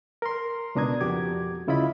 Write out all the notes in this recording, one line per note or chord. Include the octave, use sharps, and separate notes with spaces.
A#4 C6
C#2 B2 D4 A#5 D#6 G#6
F2 F#4 G4 D6 G#6
D2 C#3 E4 F4 D#5 B5